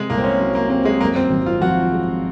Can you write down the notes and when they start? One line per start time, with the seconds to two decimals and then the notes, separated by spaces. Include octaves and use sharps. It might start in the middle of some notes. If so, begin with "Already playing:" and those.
Already playing: C3 G#3
0.10 C2 A#3
0.18 C4
0.24 C#4
0.40 F#3
0.55 A#3
0.70 A#3 C4
0.85 G#3
1.00 F#2 A#3
1.16 C4
1.30 G#1
1.46 F4
1.61 F3 F#4
1.92 G#3